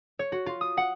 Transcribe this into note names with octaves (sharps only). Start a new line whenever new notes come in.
C#5
F#4
F4
D#6
F#5